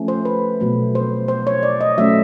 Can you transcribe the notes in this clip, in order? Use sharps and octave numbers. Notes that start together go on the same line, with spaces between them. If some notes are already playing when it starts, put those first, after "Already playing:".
Already playing: F3 A3 C#4
C5
B4
B2 F#3 A3
C5
C5
C#5
D5
D#5
F#3 A3 C#4 E5